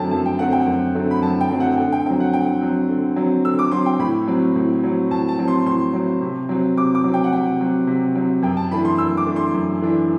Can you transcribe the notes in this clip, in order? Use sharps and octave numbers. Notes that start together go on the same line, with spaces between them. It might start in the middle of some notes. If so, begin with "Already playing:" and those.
Already playing: F#2 D3 F#3 A3 C4 G5 A5
F#2 A5
G5
D3 F#3 A3 C4 F#5
G5
F#2
D3 F#3 A3 C4
B5
F#2 A5
G5
D3 F#3 A3 C4
F#5
D3 G5
G5
F#3 C4 G5
F#5
D3 G5
F#3 C4
D3
F#3 C4
D3 E6
D6
F#3 C4 C6
G5
A2 B5
F#3 C4
A2
F#3 C4
A2 A5
A5
F#3 C4
C6
A2 C6
F#3 C4
C3
F#3 C4
C3 D6
D6
F#3 C4
G5
F#5
C3 G5
F#3 C4
C3
F#3 C4
F#2 G5
A5
E3 A3 D4 B5
C6
F#2 E6
D6
E3 A3 D4
C6
F#2
E3 A3 D4